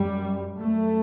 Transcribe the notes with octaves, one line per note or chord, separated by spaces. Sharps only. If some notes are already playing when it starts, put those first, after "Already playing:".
Already playing: F#2 G3
F#2 A3